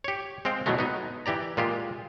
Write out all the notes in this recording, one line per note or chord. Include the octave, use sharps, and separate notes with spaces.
G4 C#5
G#3 C4 F5 G5
B2 E3 F#3 G#3 A3
B3 D#4
E3 G4 D5 A#5
A#2 G#3 F4 G4